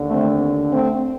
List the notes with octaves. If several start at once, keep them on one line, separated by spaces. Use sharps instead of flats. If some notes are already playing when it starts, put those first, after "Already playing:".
Already playing: D#2 D3
A3 C4
A3 C4